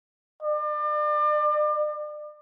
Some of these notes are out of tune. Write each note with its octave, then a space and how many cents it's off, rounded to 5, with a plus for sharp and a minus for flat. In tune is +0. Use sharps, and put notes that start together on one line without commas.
D5 +35